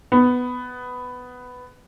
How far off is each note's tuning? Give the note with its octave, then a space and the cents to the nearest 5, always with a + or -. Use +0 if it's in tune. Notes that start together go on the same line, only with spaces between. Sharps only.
B3 +10